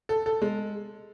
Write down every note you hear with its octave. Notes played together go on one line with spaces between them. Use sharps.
A4
A4
G#3